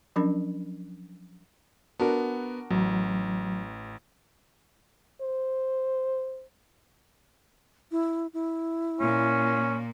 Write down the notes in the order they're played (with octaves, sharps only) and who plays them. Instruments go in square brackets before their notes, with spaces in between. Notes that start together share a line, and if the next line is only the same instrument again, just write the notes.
[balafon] F3 F#3 C#4 D4 A#4 B5
[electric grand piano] B3 [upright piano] D4 F#4 A#4
[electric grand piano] A1 [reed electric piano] F#3
[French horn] C5
[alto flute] E4
E4
[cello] A#2 A#3 [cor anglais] C#4